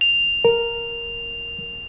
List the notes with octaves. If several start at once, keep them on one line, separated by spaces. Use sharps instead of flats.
F7
A#4